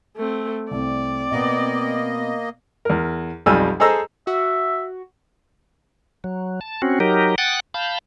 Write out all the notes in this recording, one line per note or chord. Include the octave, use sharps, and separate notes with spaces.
A3 C4
C2 A3 C4 D5
B2 A#3 B3 D#5
E2 A#4
B1 F2 G3 G#5 E6 F6
G#4 A4 C5 D#5 A#5 E6
F#4 E5
F#3
A5
C4 C#4 F#4
F#3 D#4 G4 A#4
F#5 G5 D#6 F#6 A6
F5 A5 B5 G6